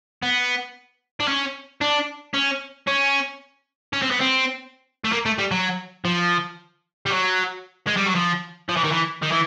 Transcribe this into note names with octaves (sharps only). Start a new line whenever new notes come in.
B3
D4
C#4
D4
C#4
C#4
C#4
C4
B3
C4
A3
A#3
A3
G3
F#3
F3
G3
F#3
G#3
G3
F#3
F3
F3
E3
D#3
E3
D#3
E3